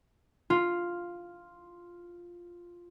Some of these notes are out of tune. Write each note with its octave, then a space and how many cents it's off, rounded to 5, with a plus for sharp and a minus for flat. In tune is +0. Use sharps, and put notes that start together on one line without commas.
F4 +0